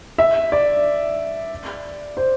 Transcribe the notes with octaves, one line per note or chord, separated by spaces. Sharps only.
E5
D5
C5